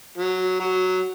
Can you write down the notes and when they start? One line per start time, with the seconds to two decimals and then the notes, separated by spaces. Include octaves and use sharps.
0.18 F#3
0.60 F#3